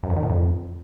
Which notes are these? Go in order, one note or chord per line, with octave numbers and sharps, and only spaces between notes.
F#2
F2
D#3
A2
F2